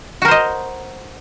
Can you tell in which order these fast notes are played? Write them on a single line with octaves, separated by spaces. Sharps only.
F#4 A#4 C5 D#5